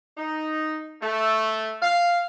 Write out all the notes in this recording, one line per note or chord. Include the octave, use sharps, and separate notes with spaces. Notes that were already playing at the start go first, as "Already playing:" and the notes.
D#4
A3
F5